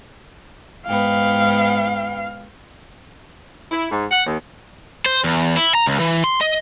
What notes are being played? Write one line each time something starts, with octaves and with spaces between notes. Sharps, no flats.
G#2 B3 F5 G5
E4
G#2
F#5
D#2
C5
E2
E4
A#5
C#2
E3
C6
D#5